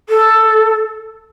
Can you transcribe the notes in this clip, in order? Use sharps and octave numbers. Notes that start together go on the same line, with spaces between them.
A4